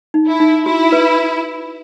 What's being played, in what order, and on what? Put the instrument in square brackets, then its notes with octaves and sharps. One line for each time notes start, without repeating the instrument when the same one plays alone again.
[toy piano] D#4
[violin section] E4
[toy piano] D#4
[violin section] E4 [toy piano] F#4
[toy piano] B4